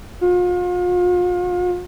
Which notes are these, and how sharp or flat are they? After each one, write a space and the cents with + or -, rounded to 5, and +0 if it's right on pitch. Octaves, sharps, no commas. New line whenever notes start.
F4 +40